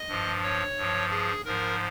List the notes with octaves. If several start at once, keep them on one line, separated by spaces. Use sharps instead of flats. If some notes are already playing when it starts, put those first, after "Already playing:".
Already playing: D#5
G2 F3
C#5
G2 F3
G#4
G#2 F3 A#4